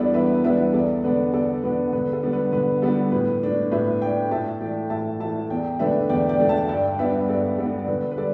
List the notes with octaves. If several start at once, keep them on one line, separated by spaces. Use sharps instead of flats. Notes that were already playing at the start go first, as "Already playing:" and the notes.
Already playing: E2 E3 G3 B3 D4 A4 B4 D5
E2 B4 E5
E3 G3 B3 D4 B4 E5
E2 A4 D5
D3 B3 D4 B4
E2 A4 D5
D3 B3 D4 B4
D3 B4
A4
G3 B3 D4
B4
D3 B4
G3 B3 D4 A4
A2 B4
A3 D4
A2 B4 E5
A3 D4 D5 G5
A2 E5 A5
E3 A3 D5 G5
A2 E5 A5
E3 A3 E5 A5
E2 D5 G5
D3 A3 D4 B4 E5
E2 D5 G5
D5 G5
D3 A3 D4
E5 A5
G2 D5 G5
G3 B3 D4 B4 E5
G2 A4 D5
G3 B3 D4 A4
D5
D3 B4
B4
G3 A4 D5